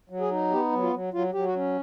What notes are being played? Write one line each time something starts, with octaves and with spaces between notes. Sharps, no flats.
F#3
G#4
D#4
B3 G4
F#3
F4
F#3
F#3 F4
F#3 G4
F#4
C#4